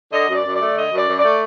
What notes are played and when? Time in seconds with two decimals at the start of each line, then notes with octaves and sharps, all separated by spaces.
0.12 D3 D#5
0.28 F#2
0.33 D5
0.44 F#2
0.55 D5
0.60 A3
0.76 D3 D#5
0.92 F#2 D5
1.07 F#2
1.18 D5
1.23 A3